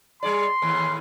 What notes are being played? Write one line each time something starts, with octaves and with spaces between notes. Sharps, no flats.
G3 G#4 D5 C6
D#2 A2 E3